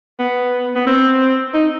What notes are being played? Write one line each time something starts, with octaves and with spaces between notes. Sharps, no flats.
B3
B3
C4
D#4